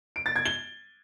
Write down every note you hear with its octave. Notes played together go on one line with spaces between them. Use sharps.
D7
A6
G#6
G7